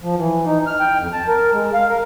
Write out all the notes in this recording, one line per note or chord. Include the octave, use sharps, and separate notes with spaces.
F3
E3
D#4
F6
G5
F2
A5
A#4
G#3
F5
A#4